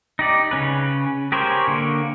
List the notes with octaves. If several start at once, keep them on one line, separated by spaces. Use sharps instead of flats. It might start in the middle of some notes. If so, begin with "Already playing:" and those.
D#4 G4 D5
C#3 C#4 B4
G4 G#4 A#4 C5 C#5
D3 A#3